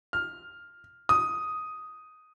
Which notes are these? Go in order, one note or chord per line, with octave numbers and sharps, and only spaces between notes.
F6
D#6